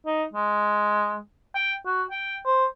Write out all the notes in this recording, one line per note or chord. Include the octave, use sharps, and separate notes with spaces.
D#4
G#3
G5
F#4
G5
C5